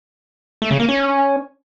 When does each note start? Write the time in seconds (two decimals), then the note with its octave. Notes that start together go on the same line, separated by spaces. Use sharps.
0.62 A3
0.71 C#3
0.80 A#3
0.89 C#4